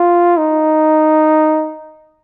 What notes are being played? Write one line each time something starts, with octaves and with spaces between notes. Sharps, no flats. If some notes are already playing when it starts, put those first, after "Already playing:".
Already playing: F4
D#4